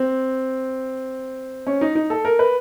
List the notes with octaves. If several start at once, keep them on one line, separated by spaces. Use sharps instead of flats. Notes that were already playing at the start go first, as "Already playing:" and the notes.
Already playing: C4
C#4
D#4
D#4
A4
A#4
B4